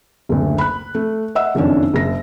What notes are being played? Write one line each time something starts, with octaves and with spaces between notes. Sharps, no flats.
F#1 D2
B5 F#6
A3
D#5 E5 F#5 E6
F#1 F2 D#3 C#4 D4
F#1 A#6